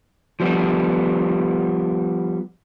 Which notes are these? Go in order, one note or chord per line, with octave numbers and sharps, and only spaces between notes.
F3 G3 B3